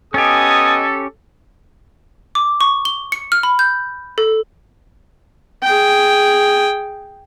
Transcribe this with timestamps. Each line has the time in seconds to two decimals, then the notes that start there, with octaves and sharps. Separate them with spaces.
0.14 B3 C#4 G4 A4 D#5 G#5 D#6
2.35 D6
2.61 C#6
2.85 G7
3.12 C#7
3.32 F6
3.43 B5
3.59 G6
4.18 A4
5.63 G#4 G5